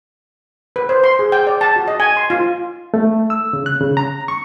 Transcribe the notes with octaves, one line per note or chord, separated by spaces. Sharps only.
B4
C5
C6
G#4
G5
D5
A5
F#4
D#5
G#5
C6
F4
A3
E6
C#3
F#6
C#3
A#5
C#6